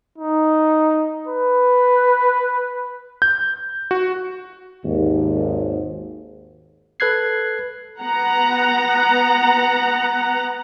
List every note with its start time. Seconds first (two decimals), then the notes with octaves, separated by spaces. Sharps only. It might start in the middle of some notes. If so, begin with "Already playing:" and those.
0.18 D#4
1.27 B4
3.22 G6
3.91 F#4
4.84 G#1 D#2
7.00 A4 B4 F#6 G#6 C7
8.00 B3 F#5 A#5